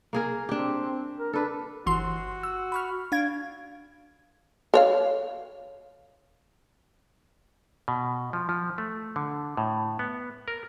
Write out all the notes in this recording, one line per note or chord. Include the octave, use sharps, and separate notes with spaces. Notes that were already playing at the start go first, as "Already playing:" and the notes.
A#3 G#4 A#4
C4 D4 G4
A#4
D4 A4 B4
G1 E3 F#4 C6
E6
B5 C#6 F6
D4 F5 G#6
A4 C#5 F5
B2
F3
F3
A3
D3
A2
B3
A#4